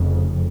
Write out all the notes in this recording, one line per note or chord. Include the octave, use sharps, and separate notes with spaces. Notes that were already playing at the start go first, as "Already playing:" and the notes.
Already playing: F1 F2 C#3